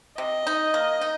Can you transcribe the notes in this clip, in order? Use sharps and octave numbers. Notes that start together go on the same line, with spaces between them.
C3 D#5
D#4
A#3
D#4